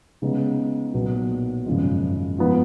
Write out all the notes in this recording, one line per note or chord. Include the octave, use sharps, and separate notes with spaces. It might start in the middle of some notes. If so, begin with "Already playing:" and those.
C#3 G#3 B3 D#4
B1 A#2 F#3 B3
G#1 F#2 C#3 F3 G#3
G#2 F3 B3